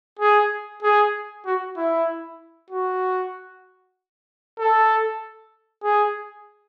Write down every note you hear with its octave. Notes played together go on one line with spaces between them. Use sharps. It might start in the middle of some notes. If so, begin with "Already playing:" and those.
G#4
G#4
F#4
E4
F#4
A4
G#4